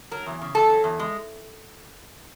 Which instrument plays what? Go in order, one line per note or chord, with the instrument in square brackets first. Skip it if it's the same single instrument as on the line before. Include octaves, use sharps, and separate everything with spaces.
[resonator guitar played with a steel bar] F#3 A#4
E2
C#3
E2 A4
F#3
E2
G#3